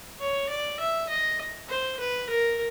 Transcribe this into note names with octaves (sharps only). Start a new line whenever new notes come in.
C#5
D5
E5
D#5
C5
B4
A#4